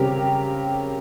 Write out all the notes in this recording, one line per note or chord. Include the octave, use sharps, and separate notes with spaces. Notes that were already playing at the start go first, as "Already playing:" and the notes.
Already playing: C#3 G3 C4 G4 A#4